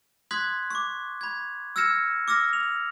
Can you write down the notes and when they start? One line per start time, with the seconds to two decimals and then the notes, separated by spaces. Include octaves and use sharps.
0.31 C6 D#6 F#6 G#6 B6
0.71 C#6 D6
1.21 B5 G#6
1.76 E6 F6 G#6 A#6 C#7 E7
2.28 D6 E6 F6 A#6
2.53 F7